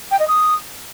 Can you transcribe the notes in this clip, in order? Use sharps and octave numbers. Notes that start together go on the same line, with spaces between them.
G5
D#5
D#6